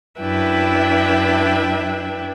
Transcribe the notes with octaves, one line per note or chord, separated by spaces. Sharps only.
F#2 D4 E4 B4 E5 G5